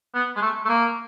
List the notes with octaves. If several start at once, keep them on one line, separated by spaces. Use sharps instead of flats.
B3
G#3
A3
A3
A#3